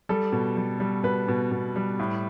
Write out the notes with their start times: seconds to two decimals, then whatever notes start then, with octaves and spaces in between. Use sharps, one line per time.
0.09 G3 A4
0.32 B2
0.57 G3
0.80 G3
1.03 B2 B4
1.28 B2
1.51 B2
1.76 G3
1.99 A2